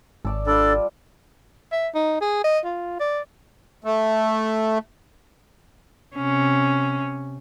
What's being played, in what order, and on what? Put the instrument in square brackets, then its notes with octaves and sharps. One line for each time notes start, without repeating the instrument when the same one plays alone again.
[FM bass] G#1 [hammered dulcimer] A4 D5 A5
[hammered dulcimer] G3 F4 [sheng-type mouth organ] D4 A4 D5
[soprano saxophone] E5
D#4
G#4
D#5
F4
D5
[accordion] A3
[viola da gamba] C3 C#4